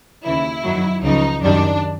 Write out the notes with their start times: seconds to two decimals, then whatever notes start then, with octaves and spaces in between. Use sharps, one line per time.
0.24 D#2 C#3 E3 E4
0.64 F#2 D#3 F#3
1.03 C#2 C#3 F3 D#4
1.42 F#2 D#3 G3 D4